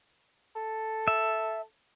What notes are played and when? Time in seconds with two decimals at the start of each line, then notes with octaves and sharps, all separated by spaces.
0.55 A4
1.08 E5